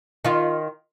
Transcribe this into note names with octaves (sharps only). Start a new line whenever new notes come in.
D#3 F4